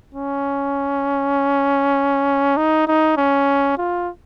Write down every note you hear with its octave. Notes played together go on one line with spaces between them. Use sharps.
C#4
D#4
D#4
C#4
F4